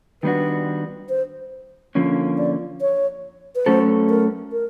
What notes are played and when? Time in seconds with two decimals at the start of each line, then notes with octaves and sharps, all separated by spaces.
0.23 D#3 G3 B3 D4 F#4 B4
1.09 C5
1.95 D3 F3 A#3 C#4
2.38 D5
2.81 C#5
3.55 B4
3.66 F#3 A3 C#4 F#4 A4 C5
4.10 A#4
4.52 A#4